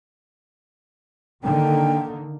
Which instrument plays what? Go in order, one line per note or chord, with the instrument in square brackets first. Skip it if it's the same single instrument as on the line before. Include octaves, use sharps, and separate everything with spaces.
[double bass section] D3 D#3 A#3 [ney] G5